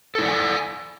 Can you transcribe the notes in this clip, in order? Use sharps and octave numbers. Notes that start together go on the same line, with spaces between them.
E4 A4 D5 F#5 G#5